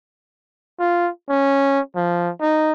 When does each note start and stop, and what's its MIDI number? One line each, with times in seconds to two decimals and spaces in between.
0.80 1.10 65
1.30 1.80 61
1.96 2.31 53
2.41 2.72 63